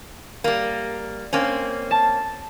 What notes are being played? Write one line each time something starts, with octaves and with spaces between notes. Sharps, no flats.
G3 A#3
A#3 C4 C#4
A5